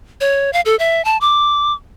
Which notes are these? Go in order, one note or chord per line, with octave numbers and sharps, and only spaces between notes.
C#5
F5
A4
E5
A5
D6